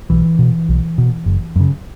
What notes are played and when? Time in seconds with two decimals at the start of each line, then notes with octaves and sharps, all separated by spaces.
0.10 B1 E3
0.39 B2
0.69 B1
0.98 B2
1.26 F#1
1.56 F#2 C#3